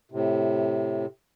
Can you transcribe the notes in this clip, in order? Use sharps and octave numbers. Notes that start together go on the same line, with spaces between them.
A2 C3